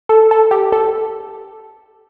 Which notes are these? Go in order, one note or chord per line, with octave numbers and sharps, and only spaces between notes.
A4
A4
G4
A4